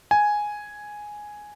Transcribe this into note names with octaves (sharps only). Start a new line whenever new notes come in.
G#5